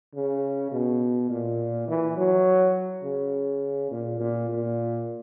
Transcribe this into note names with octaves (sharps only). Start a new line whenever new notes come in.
C#3
B2
A#2
E3
F#3
C#3
A#2
A#2
A#2